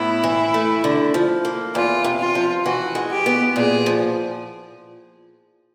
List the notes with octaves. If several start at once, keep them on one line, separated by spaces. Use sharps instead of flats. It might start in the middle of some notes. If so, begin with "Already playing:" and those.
Already playing: A2 B3 E4
E3
A3
D3
F3
A#3
E2 F4
C3
F4
F3
E3 F#4
G#3
G4
B3
A#2 G#4
F3